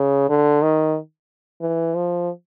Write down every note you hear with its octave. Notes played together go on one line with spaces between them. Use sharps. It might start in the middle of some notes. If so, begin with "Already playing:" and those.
Already playing: C#3
D3
D#3
E3
F3